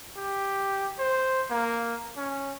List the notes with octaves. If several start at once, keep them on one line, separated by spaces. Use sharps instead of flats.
G4
C5
A#3
C#4